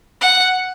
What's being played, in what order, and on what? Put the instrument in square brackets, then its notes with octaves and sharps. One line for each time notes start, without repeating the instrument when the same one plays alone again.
[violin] F#5